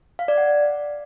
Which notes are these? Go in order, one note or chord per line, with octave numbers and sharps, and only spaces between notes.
F5
D5
F#5